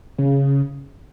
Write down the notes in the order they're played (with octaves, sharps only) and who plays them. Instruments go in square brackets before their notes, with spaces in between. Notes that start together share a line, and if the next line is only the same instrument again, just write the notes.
[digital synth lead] C#3